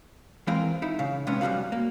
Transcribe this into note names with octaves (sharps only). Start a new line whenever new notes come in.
E3 G#3 C4 A#4 F5
D#4 E4
C#3 F5
C3 G#3 B3 C#4
F#2 G3 E4 F#4 F5
A#3